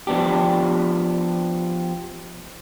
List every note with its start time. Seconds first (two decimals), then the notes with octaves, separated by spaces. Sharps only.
0.07 F3 B3 D4 G4